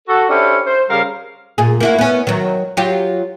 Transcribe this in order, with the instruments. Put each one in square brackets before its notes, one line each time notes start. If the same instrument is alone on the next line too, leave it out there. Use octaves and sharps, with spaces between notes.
[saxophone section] F#4 A4
C#4 D4 E4 G4 A4 C5
C5
C#3 G3 A#4 F5
[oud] A#2 G#4
A#3 E4 F#4
B3 C#4
D#3 F#3
F#3 F4 G4